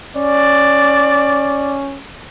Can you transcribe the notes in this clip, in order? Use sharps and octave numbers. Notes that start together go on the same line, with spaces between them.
C#4 D5